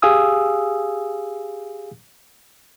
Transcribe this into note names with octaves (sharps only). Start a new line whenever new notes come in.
G4 G#4 F5 G#5 D#6 E6